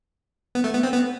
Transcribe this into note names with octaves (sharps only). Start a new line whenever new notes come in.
B3
A3
B3
C4
B3